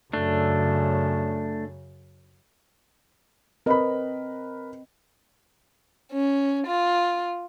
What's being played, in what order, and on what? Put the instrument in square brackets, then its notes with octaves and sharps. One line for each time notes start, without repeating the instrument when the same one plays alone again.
[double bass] F#2 C#3 [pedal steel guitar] A3 D4
[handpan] C4 D#5 [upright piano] A#4 B4 B5
[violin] C#4
F4